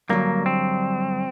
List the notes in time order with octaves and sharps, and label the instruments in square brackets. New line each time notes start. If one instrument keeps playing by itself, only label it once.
[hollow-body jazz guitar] G2 D3 F#3 [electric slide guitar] A#3
[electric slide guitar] C4